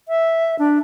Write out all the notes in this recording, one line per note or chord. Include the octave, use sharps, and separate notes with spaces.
E5
D4